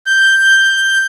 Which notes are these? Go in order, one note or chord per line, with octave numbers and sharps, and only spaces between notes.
G6